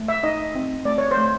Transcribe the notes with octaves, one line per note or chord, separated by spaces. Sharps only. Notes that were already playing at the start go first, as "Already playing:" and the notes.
Already playing: A3
E5
D#4 D#5
C4
A3 D5
C#5
C5
A3